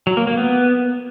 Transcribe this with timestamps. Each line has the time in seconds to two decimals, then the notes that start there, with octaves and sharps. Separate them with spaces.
0.07 F#3
0.17 A#3
0.27 A#3
0.38 B3